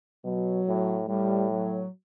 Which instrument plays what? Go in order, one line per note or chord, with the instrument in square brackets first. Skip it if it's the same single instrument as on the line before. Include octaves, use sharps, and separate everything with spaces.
[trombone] B2 [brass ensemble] F#3
[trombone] A2
[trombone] A2 [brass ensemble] G3
[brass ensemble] F#3